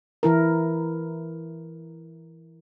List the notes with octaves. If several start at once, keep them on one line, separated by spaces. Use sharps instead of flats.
E3 E4 A#4